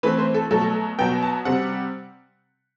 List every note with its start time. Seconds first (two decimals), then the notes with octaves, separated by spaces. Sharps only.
0.03 E3 A3 C4 B4
0.19 C5
0.34 A4
0.51 B2 F#3 A3 A4
0.99 B2 F#3 B3 G5
1.22 A5
1.45 C3 G3 C4 F#5